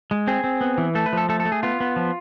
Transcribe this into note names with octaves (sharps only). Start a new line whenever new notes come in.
G#3
C4 G#4
C4
B3
E3
A3 A4
B4
F3 A4
A3 A4
A4
A3
G#4
B3 F4
B3
F3